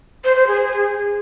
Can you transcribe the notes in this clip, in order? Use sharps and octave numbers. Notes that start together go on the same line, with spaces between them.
C5
C5
G#4